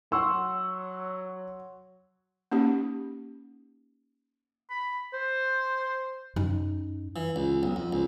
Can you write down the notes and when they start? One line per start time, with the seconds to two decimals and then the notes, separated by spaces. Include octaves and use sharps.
0.12 F#3 F#5 C6 C#6 E6
2.52 A#3 C#4 D#4 G4
4.70 B5
5.13 C5
6.36 F#2 D#4
7.16 E3
7.36 C#2
7.63 B1
7.76 F2
7.93 C#2